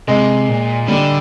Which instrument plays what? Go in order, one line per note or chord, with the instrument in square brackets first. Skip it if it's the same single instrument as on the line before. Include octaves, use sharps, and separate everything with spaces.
[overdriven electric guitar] C3 [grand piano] G#3
[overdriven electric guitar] A#2
[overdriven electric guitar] D3 [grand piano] G3